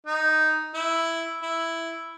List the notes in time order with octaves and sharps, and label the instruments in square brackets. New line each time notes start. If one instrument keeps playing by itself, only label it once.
[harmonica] D#4
E4
E4